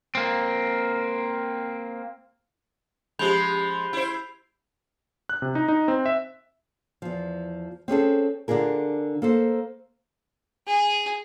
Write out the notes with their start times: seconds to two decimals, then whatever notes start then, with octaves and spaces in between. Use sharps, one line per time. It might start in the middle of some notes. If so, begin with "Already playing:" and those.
0.15 A#3 C4
3.19 F3 G#3 C#4 G4 B5 G6 F7
3.93 E4 C5
5.29 F#6
5.42 C3
5.55 D#4
5.68 D#4
5.88 C4
6.06 E5
7.02 E2 F3
7.88 C4 C#4 G#4 A4
8.48 D3 D4 F4 G#4 A#4
9.22 A#3 A4 C5
10.68 G#4